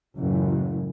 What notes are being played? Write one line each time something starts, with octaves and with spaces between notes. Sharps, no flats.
F#1 C#2 F#2 A2 E3